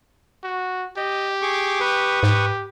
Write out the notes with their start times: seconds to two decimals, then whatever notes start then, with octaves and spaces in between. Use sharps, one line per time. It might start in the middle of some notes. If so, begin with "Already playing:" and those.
0.44 F#4
0.97 G4 D#5
1.42 G#4 C#6 D6
1.81 B4 C#6 D#6
2.23 G#2 G4